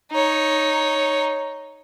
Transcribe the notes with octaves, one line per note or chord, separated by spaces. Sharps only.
D#4 C#5